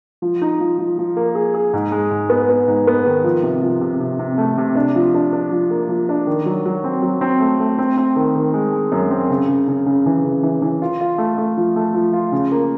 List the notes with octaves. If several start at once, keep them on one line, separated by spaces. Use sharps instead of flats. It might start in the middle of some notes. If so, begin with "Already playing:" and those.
F3
D#4
F3
F3
F3
A#3
G#4
G#4
G#2
G#3
G#2
B3
B3
G#2
B3
D#3
F3
C3
F3
C3
C3
C3
A3
C3
D4
F3
D4
D4
F3
A#3
F3
D4
D#3
F#3
F#3
C4
F#3
C4
A3
A3
C4
C4
D#3
D#3
G#3
G#3
F#2
C4
C#3
C#3
C#3
C#3
E3
C#3
E3
E3
F4
F4
A3
A3
F3
A3
F3
F4
C#3
A#3